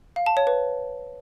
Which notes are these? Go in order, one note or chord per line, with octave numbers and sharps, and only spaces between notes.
F5
A5
C#5
B4